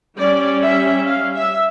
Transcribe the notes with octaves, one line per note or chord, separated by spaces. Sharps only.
G3 C#4 D5
E5
F5
E5